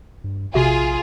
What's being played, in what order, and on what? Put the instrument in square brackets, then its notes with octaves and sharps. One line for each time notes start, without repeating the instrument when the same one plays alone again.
[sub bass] G2
[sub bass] A#1 [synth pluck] C3 F#4 E5 [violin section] F4 G#4